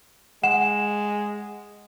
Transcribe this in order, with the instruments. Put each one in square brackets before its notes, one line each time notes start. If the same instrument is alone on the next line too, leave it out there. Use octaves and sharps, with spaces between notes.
[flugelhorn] G#3 [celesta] F#5 E7